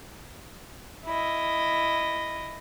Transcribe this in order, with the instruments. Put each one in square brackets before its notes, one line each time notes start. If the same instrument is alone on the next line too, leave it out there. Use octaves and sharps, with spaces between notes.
[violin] E4 D#5